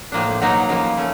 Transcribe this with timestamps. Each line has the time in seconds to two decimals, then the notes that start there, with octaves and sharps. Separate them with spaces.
0.12 A2 F3 A#3 D4
0.41 B2 F#3 A#3 D#4
0.68 C#3 F3 A#3
0.97 A3 C#4